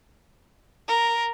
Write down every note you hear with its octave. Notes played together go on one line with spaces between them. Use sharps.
A#4